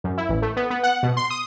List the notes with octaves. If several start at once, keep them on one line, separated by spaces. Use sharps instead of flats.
F#2
E4
A1
A3
B3
B3
F#5
B2
C6
D#6